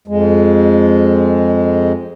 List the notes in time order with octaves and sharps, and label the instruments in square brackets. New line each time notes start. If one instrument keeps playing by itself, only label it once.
[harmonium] F2 G#3